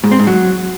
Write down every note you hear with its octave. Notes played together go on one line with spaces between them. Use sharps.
G#2
C4
G#2
F#3